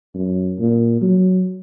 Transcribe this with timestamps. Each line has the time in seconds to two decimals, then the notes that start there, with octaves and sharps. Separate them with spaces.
0.15 F#2
0.59 A#2
1.01 F#3